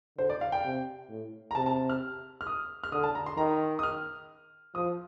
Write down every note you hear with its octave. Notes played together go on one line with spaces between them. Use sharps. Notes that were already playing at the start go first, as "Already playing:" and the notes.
D3 C5
D5
F5
G5
C3
A2
A#5
C3 A5
A5
F6
F6
D#6
F6
D3 D#6
A5
A#5
C6
D#3 A#5
D#6
F6
F3 D#6